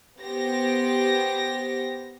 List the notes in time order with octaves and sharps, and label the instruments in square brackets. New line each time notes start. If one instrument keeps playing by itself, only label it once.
[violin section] B3 G4 C5 A#6